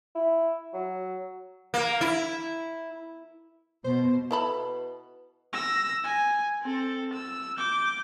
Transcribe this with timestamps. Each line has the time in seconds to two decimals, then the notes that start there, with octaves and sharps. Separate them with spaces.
0.15 E4
0.73 F#3
1.74 A#3
2.01 E4
3.84 B2 C5
4.31 B2 E4 A4 B5
5.53 E6 A#6
6.04 G#5
6.62 C4 A4
7.13 E6
7.58 D6 G6